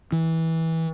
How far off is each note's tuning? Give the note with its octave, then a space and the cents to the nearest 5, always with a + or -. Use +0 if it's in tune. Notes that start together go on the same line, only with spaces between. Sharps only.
E3 -20